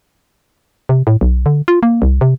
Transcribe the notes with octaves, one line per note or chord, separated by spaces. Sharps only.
C3
A2
B1
D3
F4
A#3
C2
C3